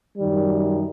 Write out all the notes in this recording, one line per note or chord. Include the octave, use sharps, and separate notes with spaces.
F#2 D#3 G3